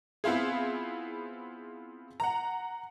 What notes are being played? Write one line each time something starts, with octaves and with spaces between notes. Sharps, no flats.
B3 C4 E4 F4 G#4
F#5 A#5